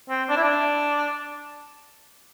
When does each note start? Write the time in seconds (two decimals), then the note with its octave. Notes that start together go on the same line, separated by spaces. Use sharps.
0.09 C4
0.29 D4
0.37 E4
0.44 D4